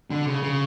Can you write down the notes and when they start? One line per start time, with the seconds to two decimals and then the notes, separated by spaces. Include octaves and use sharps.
0.11 D3
0.27 C#3
0.43 C#3